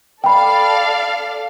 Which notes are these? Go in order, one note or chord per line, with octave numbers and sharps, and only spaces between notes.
A4 D5 F5 G5 B5